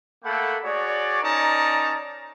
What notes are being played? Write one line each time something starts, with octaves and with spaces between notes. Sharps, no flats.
A3 A#3 A4 F#5 G5 B5
F#4 G#4 C#5 D5
C#4 D#4 A#4 D5 A5 A#5